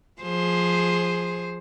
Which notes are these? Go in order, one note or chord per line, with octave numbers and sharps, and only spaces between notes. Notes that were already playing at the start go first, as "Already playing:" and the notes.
F3 G#4 C5